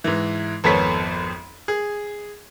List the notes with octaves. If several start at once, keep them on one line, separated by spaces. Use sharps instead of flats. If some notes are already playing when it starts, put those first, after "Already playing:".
G#2 E3
G#1 F2 B3 A4 C#5 B6
G#4